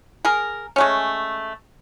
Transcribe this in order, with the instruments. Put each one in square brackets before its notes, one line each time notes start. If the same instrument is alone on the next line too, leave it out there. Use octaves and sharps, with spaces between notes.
[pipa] G#4 A#4
G#3 A3 C#4